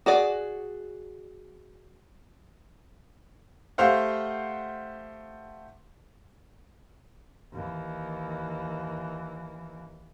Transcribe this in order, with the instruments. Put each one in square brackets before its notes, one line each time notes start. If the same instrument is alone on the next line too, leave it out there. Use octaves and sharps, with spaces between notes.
[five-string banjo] F#4 G#4 D5
[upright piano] A3 G4 C5 F5 F#5
[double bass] D#2 E3